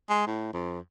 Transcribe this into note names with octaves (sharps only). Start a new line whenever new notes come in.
G#3
A2
F2